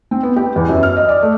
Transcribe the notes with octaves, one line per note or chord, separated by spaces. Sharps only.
C4
B3
G4
E2
F#2
F6
D#5
D5
A3